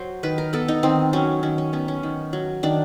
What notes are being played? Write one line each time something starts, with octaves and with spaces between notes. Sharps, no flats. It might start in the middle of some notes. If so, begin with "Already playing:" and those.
Already playing: F#3 C5
D#3 B4
A#4
B3 A4
D#4
D#3 C4
F#3 C#4
D#3 C#4
C#4
B3 C#4
C#4
D#3
F#3
D#3 D4